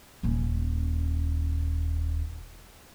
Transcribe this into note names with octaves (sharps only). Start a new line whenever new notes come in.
D#1 C#4